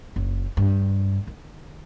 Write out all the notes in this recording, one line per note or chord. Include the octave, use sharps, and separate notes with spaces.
F#1
G2
D#3